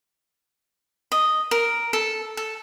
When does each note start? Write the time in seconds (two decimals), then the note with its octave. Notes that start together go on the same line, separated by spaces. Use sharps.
1.12 D#5
1.51 A#4
1.93 A4
2.37 A4